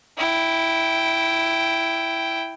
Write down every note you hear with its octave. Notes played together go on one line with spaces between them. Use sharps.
E4 G5